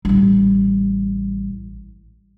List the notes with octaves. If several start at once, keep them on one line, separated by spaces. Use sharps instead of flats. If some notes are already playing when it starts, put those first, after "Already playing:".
A1 G3